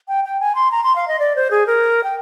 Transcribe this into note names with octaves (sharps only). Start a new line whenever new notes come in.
G5
G5
G#5
C6
A#5
C6
F5
D#5
D5
C5
G#4
A#4
G5